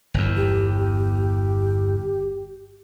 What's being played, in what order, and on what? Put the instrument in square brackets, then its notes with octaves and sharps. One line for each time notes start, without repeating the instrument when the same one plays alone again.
[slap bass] G1 E2
[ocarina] G4